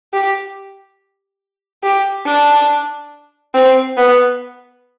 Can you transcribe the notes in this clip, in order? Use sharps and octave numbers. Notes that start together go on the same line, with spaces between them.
G4
G4
D4
C4
B3